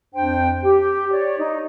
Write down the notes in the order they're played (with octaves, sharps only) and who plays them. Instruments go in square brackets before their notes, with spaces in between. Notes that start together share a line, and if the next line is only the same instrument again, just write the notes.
[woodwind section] F2 D4 C5 G5
G4
C#5 D5
D#4